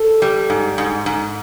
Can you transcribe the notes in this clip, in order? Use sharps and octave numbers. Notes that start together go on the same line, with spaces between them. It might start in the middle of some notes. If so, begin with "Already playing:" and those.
Already playing: A4
G3
G#2
G#2
G#2